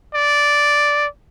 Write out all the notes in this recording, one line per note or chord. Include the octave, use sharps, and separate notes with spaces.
D5